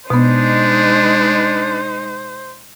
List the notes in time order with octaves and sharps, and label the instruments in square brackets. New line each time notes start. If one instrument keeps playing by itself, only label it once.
[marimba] B2 B3 [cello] G#3 D#4 [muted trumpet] D4 [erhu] C5